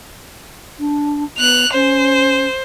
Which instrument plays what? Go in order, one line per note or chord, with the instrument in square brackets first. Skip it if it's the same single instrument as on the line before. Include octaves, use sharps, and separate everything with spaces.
[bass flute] D4
[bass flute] B3 [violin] F#6 F7
[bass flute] C#4 [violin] C5